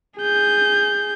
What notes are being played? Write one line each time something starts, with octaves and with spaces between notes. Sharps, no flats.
G#4 G6